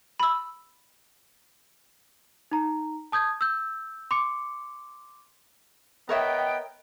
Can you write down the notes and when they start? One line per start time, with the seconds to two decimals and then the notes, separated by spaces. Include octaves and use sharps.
0.20 B5 E6
2.51 D#4 A#5
3.12 A5 D#6 G6 G#6
3.41 E6 G6
4.11 C6 D6 C#7
6.09 B3 A#4 C#5 D#5 E5 G5